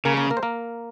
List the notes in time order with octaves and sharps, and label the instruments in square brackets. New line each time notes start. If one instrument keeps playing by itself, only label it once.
[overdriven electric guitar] C#3 [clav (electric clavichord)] A#3 A#4
[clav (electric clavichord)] A#3 A#4
A#3 A#4
C5
A#3 A#4